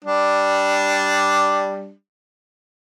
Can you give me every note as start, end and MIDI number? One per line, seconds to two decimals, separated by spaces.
0.05 1.93 55
0.05 1.93 62